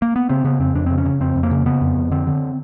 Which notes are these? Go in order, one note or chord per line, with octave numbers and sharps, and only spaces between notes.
A#3
B3
C#3 C4
C#3 B3
F2 C4
F2 D4
C#3 C4
C#4
C#3
F2 C4
F2
A#3
C#3
C#3 B3
F2
F2
D3 C4
D3